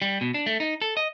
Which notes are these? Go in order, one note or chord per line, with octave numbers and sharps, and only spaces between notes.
G3
B2
D4
A3
D#4
A4
D#5